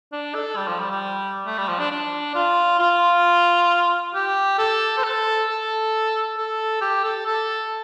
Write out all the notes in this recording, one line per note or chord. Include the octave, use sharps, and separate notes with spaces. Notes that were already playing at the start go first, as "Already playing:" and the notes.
D4
A4
G3
F3
G3
G3
A3
G3
F3
D4
D4
F4
F4
G4
A4
C5
A4
A4
A4
G4
A4
A4